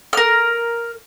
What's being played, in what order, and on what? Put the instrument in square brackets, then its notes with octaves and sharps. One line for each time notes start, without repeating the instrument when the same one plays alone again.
[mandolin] A#4 F6